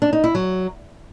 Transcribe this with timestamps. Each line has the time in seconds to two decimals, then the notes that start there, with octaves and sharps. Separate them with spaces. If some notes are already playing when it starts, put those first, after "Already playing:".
0.02 D4
0.13 D#4
0.24 E4
0.35 F#3